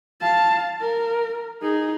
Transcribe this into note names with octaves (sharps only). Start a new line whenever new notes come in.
F5 A5
A#4
D#4 G#4